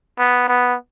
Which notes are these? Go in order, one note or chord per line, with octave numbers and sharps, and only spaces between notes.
B3
B3